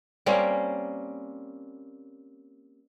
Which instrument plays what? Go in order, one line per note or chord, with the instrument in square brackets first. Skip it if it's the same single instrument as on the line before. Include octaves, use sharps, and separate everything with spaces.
[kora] G3 A#3 C4 C#4